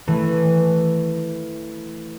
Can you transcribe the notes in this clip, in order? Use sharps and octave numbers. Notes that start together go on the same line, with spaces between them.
E3 A3